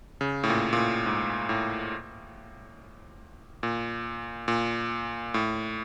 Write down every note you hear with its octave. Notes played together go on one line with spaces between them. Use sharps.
C#3
A2
A#2
A#2
A2
G#2
A2
A#2
A#2
A2